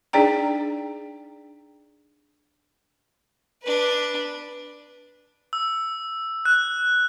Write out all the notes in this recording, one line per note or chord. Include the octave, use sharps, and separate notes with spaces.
D4 D#4 G#4 D5 G5 A#5
D4 B4
E6
F#6